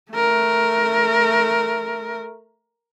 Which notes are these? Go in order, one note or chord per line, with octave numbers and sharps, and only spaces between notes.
A3 A#4